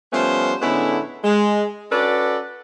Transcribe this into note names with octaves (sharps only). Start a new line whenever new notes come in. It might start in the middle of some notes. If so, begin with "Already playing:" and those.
F3 G3 A3 B3 C#4 C5
A2 D3 G#3 B3 C#4 E4
G#3
C#4 F#4 A4 B4 D5